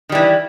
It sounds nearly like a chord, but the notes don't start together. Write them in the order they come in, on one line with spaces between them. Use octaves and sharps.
D#3 G3 E3